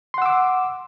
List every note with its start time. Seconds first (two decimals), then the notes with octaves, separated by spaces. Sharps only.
0.14 C6
0.18 F#5
0.22 E6
0.26 D6